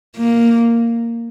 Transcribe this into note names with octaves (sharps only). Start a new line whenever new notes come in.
A#3